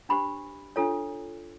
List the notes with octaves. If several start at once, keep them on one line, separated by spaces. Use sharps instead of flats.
D4 G4 C5 B5
D4 F4 A4 C#5